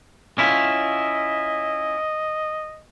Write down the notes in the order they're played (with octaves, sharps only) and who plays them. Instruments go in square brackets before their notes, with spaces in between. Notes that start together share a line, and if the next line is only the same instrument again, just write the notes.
[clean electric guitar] C#4 E4 F4 [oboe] D#5